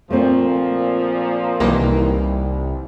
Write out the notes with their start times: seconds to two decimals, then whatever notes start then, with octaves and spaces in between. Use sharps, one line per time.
0.10 A#2 F3 A3 C4
1.60 C2 D#3 E3 A#3